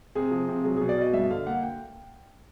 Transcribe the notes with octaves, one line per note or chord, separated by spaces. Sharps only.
C3 G#4
F3
C3
F#3 G#4
B2 G#4
D5
B2 D#5
G2 E5
D3 F5
A#3 F#5
G5